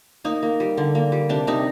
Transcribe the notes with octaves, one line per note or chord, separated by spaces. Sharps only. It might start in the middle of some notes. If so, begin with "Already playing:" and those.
A#3 D#4
A#3
G3
D3
A#3
G3
C3 D4
C3 D#4